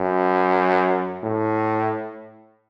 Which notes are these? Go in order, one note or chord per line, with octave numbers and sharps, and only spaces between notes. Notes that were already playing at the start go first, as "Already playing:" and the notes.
Already playing: F#2
A2